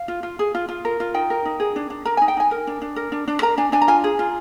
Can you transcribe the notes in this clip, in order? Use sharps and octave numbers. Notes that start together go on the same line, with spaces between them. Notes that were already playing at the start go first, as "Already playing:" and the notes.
Already playing: F5
F4
F4
G#4
F4
F4
A#4
F4
D#4 G5
A#4
D#4
G#4
D4
D4
A#4 A#5
D#4 G#5
G5
D#4 G#5
A#4
D4
D4
A#4
D4
D4
A#4 A#5
D4 G#5
D4 G#5
A#5
F4 G#5
G#4
F4